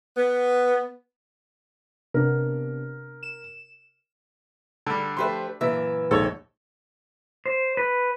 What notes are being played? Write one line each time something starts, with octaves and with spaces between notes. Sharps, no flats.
B3
C3 B3 D4 A#4
E7
D3 G3 D4
F3 A3 G4 B4 C5 C6
F#2 A#2 E3 E5
A#1 D#2 G#2 A4 C#5
C5
B4